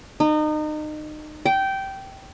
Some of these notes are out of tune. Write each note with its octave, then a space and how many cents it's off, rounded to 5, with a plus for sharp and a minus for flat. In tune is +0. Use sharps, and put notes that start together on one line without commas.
D#4 -30
G5 -15